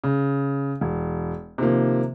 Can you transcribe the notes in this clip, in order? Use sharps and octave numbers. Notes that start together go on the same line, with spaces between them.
C#3
E1
C3 D#3 F3 A#3